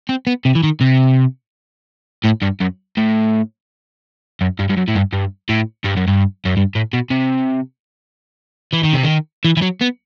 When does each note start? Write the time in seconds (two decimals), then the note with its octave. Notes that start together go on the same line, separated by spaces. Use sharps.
0.09 C4
0.27 B3
0.45 C3
0.55 E3
0.63 D#3
0.81 C3
2.25 A2
2.42 G2
2.61 F#2
2.98 A2
4.41 F#2
4.59 G2
4.69 G2
4.77 F#2
4.88 A2
4.95 G2
5.13 G2
5.49 A2
5.84 G2
5.96 F#2
6.07 G2
6.45 F#2
6.57 G2
6.75 A2
6.93 B2
7.10 C3
8.73 E3
8.83 D#3
8.93 C3
9.03 D#3
9.45 E3
9.57 E3
9.62 F#3
9.81 B3